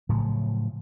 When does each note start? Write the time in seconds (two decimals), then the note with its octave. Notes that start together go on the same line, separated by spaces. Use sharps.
0.09 A2 C#3 F3 F#3